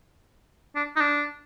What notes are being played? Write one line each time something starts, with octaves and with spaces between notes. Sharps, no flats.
D4
D#4
D4